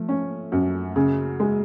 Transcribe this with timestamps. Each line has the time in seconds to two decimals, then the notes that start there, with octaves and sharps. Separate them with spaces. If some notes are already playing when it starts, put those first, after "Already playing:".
Already playing: F3 A3
0.09 C#4
0.52 F#2
0.96 C#3
1.40 G#3